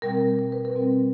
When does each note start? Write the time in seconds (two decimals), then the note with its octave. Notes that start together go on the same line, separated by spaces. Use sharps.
0.02 B2 G3 C4 A#4
0.39 A#4
0.52 B4
0.65 A#4
0.75 B2 G3 C4